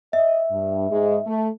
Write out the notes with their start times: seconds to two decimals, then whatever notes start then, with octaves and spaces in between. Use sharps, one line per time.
0.13 D#5 E5
0.51 G2
0.91 G#2 G#3
1.27 A3